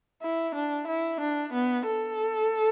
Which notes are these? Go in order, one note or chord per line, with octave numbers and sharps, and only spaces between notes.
E4
D4
E4
D4
B3
A4